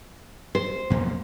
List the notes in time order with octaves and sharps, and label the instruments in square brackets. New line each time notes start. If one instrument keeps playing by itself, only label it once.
[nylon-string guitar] C5
[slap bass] B1 F2 A#3